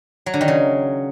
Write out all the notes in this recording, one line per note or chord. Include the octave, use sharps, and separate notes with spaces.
F#3
D3
D#3
C#3